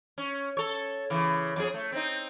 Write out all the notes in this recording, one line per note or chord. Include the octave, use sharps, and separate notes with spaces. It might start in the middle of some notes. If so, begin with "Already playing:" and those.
C#4
A4 C#5
C#3 E3
F2 G#4
A3
C4 D#4